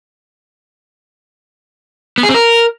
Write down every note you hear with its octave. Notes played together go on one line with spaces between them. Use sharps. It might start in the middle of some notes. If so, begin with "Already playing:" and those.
B3
G#4
C4
A#4